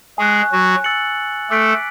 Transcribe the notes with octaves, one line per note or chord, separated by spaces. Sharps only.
G#3 G#4 G#5 C#6 F#6
F#3 F#4
E6 A6 C#7 F#7
A3 A4 D6 F#6 B6 D7